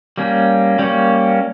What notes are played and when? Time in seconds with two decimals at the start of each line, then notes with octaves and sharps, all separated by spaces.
0.17 G3 A#3 C#4
0.79 G3 A#3 C#4